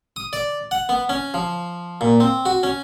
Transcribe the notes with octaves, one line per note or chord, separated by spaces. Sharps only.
D#6
D5
F#5
B3
C#4
F3
A#2
C4
F#4
C#4